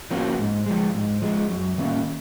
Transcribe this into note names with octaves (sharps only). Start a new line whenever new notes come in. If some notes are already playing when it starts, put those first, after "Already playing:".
F3 A#3 C#4 F#4
G#2
F3 G#3
G#2
F3 G#3
F#2
D#3 A#3 C#4